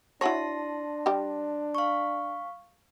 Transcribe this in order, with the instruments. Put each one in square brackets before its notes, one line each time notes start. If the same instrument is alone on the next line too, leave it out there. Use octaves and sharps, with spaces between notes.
[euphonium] D4 [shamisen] E4 F#4 C#5 [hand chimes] A5 C6 A#6
[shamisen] G3 G4
[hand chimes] F5 C#6